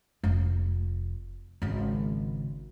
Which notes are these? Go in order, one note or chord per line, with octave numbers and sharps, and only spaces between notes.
F1
G#1 C#3